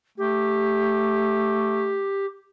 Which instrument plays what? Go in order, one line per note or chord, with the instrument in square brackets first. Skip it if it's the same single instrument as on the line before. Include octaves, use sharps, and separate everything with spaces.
[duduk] A3 [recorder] G4